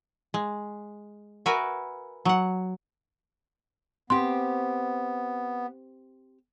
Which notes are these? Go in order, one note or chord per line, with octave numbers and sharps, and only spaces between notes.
G#3
F#4 A#4 B4 E5 G#5
F#3 F#5
B3 C4 G4 C6